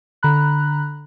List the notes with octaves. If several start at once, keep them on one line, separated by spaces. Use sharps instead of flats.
D3 A#5 B5 F#6